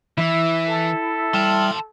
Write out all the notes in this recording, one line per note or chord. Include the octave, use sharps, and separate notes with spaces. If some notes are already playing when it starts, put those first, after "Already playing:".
E3 E4
A4
G3 G5 A5 C6 F6